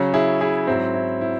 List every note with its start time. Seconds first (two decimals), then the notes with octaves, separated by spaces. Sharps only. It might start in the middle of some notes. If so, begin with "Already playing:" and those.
Already playing: C#3 F#3 C#4
0.14 E4 G#4
0.41 E4 G#4
0.67 G#2 F#3 C4 E4
0.95 E4
1.21 E4